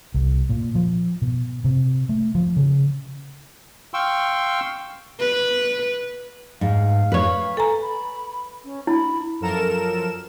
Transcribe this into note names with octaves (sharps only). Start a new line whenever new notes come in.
C2
A#2
F3
B2
C3
A3
F3
C#3
F5 G5 C6 C#6 E6
B4
G#2 F5
B4 C#5
A4 G#5 A#5
B5
C#4
E4 B5
F#2 F3 A4 A#4 E7